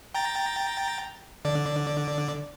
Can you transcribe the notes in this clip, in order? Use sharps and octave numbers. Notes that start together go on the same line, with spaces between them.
G5 A#5 A6
D3 D5